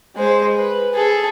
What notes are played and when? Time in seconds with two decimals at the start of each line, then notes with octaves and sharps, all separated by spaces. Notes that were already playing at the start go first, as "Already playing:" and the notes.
0.16 G#3 C5
0.56 B4
0.93 G#4 A4